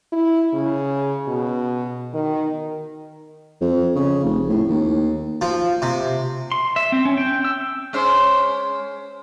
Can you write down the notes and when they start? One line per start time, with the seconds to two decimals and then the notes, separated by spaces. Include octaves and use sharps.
0.12 E4
0.54 C#3
1.28 B2
2.14 D#3
3.61 F2
3.96 C#3
4.24 F1
4.49 A2
4.68 D#2
5.41 F3
5.82 C3
6.52 C6
6.76 E5
6.92 C4
7.05 C#4
7.17 G5
7.44 E6
7.93 G#3 C#4 C5